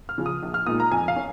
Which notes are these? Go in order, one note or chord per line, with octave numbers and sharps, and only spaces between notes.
F6
C#3 F3
D#6
A#1
F6
A#2 G#3 D#4 D#6
A#5
F2 G#5
F5
C#4